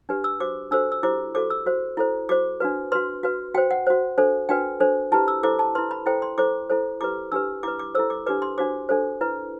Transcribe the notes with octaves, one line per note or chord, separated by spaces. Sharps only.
D4 G4 B4
E6
F#4 C5 D6
D4 F#4 A4 C5 E6
E6
E4 G4 C5 D6
F#4 A4 C5 D6
E6
F#4 C5
E4 A4 C5
F#4 C5 D6
D4 F#4 B4
F#4 B4 C6
F#4 B4
F#4 C5 G5
F#5
F#4 C5
D4 A4 C5
D4 F#4 B4 G5
D4 A4 C5
E4 G4 B4 A5
E6
E4 A4 C5 D6
A5
E4 B4 C6
B5
E4 A4 C5 G5
C6
E4 A4 C5 D6
E4 A4 C5
E4 G4 B4 D6
D4 G4 B4 E6
E4 B4 D6
D6
E4 A4 C5 E6
D6
D4 G4 B4 D6
C6
D4 F#4 C5 D6
D4 A4 C5
E4 B4